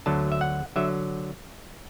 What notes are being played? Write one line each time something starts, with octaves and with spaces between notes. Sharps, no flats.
D2 D3 F#3 A5
E5
F#5
D3 F#3 E5